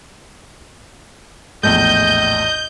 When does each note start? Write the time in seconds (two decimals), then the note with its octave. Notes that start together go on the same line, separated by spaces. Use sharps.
1.63 A#1 E2 A2 D#5 G6